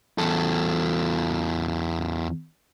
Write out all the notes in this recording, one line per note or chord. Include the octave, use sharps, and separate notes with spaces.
E2 A4